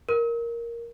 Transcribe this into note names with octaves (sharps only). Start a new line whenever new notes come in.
A#4